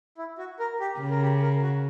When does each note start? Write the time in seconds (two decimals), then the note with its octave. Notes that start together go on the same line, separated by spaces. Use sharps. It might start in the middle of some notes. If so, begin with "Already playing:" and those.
0.18 E4
0.38 F#4
0.59 A#4
0.80 G4
1.00 C#3
1.10 A#4
1.22 G4
1.42 A#4
1.62 F#4